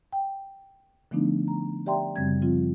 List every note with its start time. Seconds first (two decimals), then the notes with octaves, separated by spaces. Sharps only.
0.12 G5
1.11 D3 F3 A3 B3 D4 D#4
1.48 A#5
1.86 G4 D5 E5 G5 A#5 C6
2.16 F#2 C#3 G3 C4 G#6
2.42 F3 C4 F4